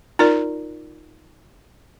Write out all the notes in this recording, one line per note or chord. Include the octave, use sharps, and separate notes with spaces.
D#4 F4 A#4 D5